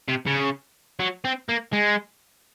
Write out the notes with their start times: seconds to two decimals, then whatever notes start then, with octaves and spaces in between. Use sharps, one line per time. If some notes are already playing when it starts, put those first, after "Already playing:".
0.08 C3
0.26 C#3
1.00 F#3
1.24 C4
1.49 A#3
1.73 G#3